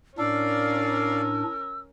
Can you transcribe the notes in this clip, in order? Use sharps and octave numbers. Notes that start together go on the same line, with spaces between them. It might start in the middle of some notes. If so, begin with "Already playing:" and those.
A2 C#4 D4 A#4 D5 F5 E6